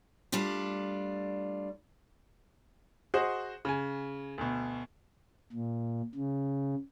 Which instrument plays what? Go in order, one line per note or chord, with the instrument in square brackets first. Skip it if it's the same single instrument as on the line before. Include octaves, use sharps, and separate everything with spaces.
[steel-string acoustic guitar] G3 A3 D4 F4
[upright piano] F#4 G#4 C5 D#5
C#3 G#5
D2 B2
[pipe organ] A#2
C#3